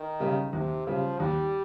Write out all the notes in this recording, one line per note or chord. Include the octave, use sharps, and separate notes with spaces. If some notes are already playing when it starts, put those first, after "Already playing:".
Already playing: D#3
C#3 G3
D#2 C3
C#3 F3 G3
D#2 G3